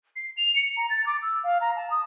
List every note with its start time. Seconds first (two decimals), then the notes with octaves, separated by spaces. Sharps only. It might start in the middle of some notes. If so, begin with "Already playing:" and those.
0.16 C7
0.37 F7
0.56 C#7
0.77 A#5
0.90 A6
1.06 D6
1.22 E6
1.44 F5
1.61 A#5
1.76 A5
1.91 D#6